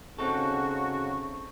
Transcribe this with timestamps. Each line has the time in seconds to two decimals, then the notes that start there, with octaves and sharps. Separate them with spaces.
0.19 C#3 C4 D#4 F#4 A4 C#6